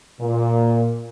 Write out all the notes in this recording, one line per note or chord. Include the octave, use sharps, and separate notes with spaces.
A#2